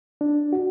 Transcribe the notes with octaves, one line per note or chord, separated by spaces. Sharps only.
D4
F#4